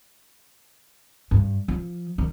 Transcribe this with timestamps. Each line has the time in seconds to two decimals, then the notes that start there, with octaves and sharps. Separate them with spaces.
1.31 G2
1.68 F3
2.18 D#3